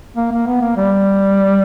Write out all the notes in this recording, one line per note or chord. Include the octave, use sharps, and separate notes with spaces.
A#3
A#3
B3
A#3
G3